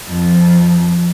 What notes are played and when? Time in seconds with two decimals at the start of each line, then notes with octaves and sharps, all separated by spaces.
0.11 F2